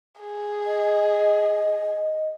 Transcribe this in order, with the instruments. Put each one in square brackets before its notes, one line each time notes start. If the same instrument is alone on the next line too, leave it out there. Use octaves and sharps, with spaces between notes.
[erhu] G#4
[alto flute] D#5